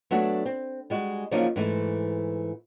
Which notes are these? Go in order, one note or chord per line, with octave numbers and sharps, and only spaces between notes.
F#3 A3 B3 D4 F#4
C4
G3 G#3 F#4
C#3 F3 F#3 A#3 D4 D#4
G#2 E3 A3